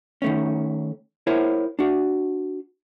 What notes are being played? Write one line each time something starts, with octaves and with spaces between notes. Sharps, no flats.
D#3 A3 C#4
E4 A#4 C5 C#5
D4 F#4